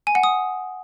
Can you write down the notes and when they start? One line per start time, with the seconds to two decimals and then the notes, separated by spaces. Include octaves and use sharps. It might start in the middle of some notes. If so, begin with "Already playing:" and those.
0.07 G#5
0.15 F#5
0.23 D#6